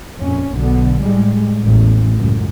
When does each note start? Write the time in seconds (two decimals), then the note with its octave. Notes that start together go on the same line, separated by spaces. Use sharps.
0.18 F2 A#2 C#4
0.53 B1 D3 B3
1.01 A2 G3 G#3
1.63 A1 E2 A2
2.15 C#2 F#2 A2